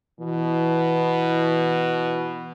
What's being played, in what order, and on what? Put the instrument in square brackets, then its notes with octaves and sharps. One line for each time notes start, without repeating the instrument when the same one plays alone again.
[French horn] B2 [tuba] E3